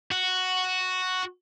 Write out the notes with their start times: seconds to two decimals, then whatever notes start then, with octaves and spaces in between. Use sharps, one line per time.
0.12 F#4